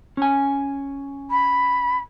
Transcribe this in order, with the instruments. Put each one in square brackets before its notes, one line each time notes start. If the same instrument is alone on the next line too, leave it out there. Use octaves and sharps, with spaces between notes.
[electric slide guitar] C#4 G#5
[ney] B5